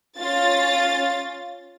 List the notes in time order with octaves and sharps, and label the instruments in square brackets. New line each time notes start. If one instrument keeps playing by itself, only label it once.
[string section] C#4 F4 A6